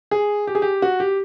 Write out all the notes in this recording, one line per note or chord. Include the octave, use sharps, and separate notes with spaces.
G#4
G4
G#4
G4
F#4
G4